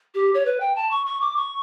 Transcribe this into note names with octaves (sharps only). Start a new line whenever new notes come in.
G4
C#5
B4
G5
A5
C#6
C#6
D6
C#6